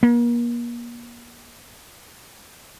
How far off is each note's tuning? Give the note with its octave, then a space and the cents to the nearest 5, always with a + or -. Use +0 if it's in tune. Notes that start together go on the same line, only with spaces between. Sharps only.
A#3 +35